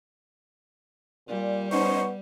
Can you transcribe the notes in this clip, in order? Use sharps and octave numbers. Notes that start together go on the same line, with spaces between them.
A#2 G3
B3 C#4 D#4 C5 C#6